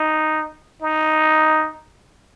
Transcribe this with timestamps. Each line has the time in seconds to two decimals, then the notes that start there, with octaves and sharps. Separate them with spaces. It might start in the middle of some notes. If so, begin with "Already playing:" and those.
Already playing: D#4
0.82 D#4